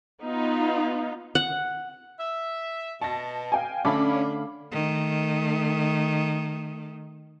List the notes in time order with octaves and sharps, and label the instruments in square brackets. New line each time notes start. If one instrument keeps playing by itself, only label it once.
[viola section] B3 D#4 F4
[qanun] F#5
[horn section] E5
[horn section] B2 [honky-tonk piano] A5 A#6
[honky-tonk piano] F5 G5 G#5
[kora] D3 A3 [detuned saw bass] C#4 [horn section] D4 [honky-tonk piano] F5 B5 D6
[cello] D#3 A3